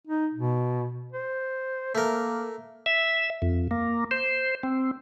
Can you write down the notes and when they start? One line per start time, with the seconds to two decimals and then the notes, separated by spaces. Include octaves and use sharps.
0.07 D#4
0.34 B2
1.12 C5
1.95 A3 A#3 A#4
2.86 E5
3.42 F2
3.71 A#3
4.11 C5
4.63 C4